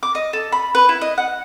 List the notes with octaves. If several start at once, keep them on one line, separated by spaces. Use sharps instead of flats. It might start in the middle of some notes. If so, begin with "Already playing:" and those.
D6
D#5
A4
B5
B4
E4
D#5
F#5